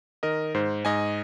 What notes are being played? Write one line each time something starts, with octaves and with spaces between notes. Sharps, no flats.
D#3 A#4 D#5
G#2 C5
G#2 D#5 G#5